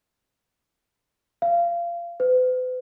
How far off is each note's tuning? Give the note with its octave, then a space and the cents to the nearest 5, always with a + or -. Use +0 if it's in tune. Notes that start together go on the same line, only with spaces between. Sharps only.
F5 -25
B4 +45